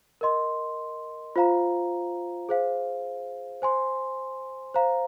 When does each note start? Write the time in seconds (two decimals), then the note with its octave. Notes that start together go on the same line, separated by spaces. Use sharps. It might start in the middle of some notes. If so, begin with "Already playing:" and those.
0.21 A#4 D#5 C6
1.36 F4 C5 F5 A#5
2.49 G#4 C5 F5
3.62 C5 G#5 C6
4.74 C5 F5 A#5